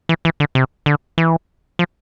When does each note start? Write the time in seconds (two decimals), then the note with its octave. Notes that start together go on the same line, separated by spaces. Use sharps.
0.09 E3
0.25 E3
0.40 D3
0.55 C3
0.86 D3
1.18 E3
1.79 F3